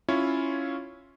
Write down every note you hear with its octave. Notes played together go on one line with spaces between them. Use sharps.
C#4 E4 F4 C#5